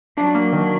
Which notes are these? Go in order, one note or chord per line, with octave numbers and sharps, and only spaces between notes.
F#3 D4
A#3
D#3